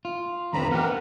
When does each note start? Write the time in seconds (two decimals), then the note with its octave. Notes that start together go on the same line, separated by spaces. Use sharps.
0.05 F4
0.53 E2 G2 D3 C4 A#5 B5
0.71 B3 G4 A#4 F#5